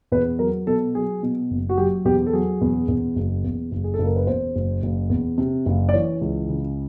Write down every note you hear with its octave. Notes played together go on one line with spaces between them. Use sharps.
E2 B4
F#3 A#4
B2 A4
F#3 G#4
B2
F#1
F#4
F#3 G4
E2 G4
A4
F#3 G#4
E2
E2
F#1
E2
F#1
G#4
A4
F#1
A#4
B4
E2 C5
F#1
F#1
E2
C3
F#1
D5
E3 C#5
C#2
C#3